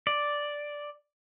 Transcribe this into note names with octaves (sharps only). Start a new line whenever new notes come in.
D5